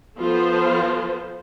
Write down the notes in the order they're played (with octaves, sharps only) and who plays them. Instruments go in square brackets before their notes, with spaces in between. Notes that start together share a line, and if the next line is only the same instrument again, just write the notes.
[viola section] F3 B3 F4 A4 C5